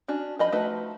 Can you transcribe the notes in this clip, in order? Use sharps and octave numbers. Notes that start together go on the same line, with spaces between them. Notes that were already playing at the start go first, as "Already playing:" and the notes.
C#4 D4 F#4
F3 D#5 B5
F3 A3 D#4 F#4 B4